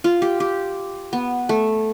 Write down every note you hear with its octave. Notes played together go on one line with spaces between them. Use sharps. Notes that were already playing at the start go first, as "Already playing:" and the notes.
F4
G4
G4
B3
A3